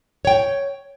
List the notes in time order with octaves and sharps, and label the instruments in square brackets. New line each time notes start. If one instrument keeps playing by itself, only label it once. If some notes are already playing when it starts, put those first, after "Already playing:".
[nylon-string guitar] C#5 G5